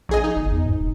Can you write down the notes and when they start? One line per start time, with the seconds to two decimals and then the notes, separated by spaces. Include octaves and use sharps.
0.09 A#1 G#4 D#5
0.24 D#4
0.36 G1
0.52 E2
0.66 G#2
0.80 E1